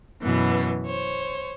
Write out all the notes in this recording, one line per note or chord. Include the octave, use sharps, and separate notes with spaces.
F#2 B2 E3 B3
C5 C#5